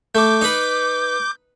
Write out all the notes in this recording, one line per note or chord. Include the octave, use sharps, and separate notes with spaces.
A3 D6 G6
D#4 B4